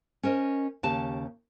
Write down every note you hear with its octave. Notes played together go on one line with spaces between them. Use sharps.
C#4 A#4 C5 D#5
D#2 C#3 G4 A5